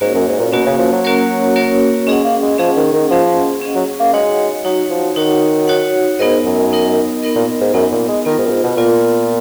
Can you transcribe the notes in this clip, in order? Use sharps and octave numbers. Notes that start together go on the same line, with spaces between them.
G#2 A#3 C#4 F#4 A#4 C#5
F#2
G#2
A#2
B2 A#3 C#4 F#4 A#4 C#5
C#3
F3
F#3
A#3 C#4 F#4 A#4 C#5
A#3 C#4 F#4 A#4 C#5
G#3 C#4 G#4 D#5 F#5
A#3
G#3
F3 C#4 G#4 D#5 F#5
D#3
D#3
F3 C#4 G#4 D#5 F#5
C#4 G#4 D#5 F#5
F#3
A#3
G#3 D#4 F#4 C#5 F#5
F#3 D#4 F#4 C#5 F#5
F3
D#3 D#4 F#4 C#5 F#5
D#4 F#4 C#5 F#5
G#2 B3 D#4 A#4 D#5
F#2
B3 D#4 A#4 D#5
B3 D#4 A#4 D#5
A#2
G#2
F#2 B3 D#4 A#4 D#5
A#2
G#3
D#3 B3 F4 A#4
G#2
F#2
G#2
B2
A#2 B3 F4 A#4